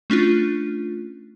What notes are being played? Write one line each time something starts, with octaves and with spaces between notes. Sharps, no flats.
A3 C#4 D4 F4